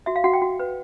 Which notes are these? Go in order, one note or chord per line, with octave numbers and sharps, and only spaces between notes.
F#4 E5
F5
F#4 F#5
G5
F#4
B4